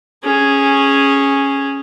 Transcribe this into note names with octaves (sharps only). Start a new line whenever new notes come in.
C#4 G#4